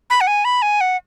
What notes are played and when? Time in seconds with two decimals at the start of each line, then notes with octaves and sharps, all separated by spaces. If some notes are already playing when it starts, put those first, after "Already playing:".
0.10 B5
0.21 F#5
0.27 G#5
0.45 B5
0.62 G#5
0.81 F#5